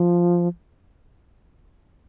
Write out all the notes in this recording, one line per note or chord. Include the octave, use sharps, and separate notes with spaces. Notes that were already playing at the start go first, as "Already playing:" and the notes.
Already playing: F3